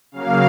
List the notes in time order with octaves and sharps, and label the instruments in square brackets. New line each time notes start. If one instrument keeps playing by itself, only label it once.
[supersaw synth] C#3 F#3 A#3 F5